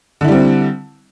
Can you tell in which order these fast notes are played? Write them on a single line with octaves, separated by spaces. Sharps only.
D3 E4 G3 C4